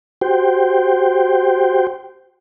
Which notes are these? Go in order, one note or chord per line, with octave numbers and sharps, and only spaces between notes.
F#4 G4 C5 G5